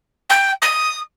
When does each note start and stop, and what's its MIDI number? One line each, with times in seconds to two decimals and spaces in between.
0.29 0.51 79
0.62 1.00 87